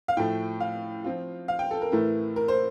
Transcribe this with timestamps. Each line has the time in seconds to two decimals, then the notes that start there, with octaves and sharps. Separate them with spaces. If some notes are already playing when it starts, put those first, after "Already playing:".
0.08 F5
0.17 A2 F3 A3 G5
0.60 F5
1.04 F3 C4 F4
1.48 F5
1.59 G5
1.71 A4
1.82 A#4
1.92 A2 E3 A3 E4 A#4
2.36 A#4
2.48 C5